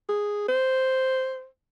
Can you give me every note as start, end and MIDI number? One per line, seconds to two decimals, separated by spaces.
0.09 0.46 68
0.48 1.46 72